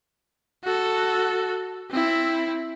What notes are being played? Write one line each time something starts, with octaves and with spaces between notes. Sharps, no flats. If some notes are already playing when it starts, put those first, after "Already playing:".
F#4 A4
C4 E4